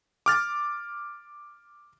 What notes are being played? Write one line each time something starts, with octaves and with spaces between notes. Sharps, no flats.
D6 F6 A6